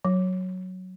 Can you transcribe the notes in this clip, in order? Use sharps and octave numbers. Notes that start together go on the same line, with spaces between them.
F#3